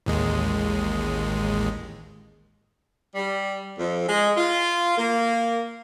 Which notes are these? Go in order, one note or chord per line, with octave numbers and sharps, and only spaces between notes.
A1 D#2 G#3
G3
F2
G#3
F4
A#3